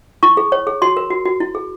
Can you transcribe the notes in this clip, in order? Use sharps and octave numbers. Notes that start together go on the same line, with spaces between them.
E4 C#6
G#4
C#5
G#4
F#4 C6
A#4
F#4
F#4
E4
G#4